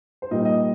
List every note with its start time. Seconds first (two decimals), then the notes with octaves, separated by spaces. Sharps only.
0.22 C5
0.31 A#2 G3 D#4 D#5
0.45 D#5